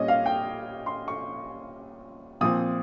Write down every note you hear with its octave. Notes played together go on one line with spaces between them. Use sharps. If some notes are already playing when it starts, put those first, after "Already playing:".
Already playing: A#2 G3 C#4 D#5
F5
G5
C6
C#6
A#2 F3 C4 D#6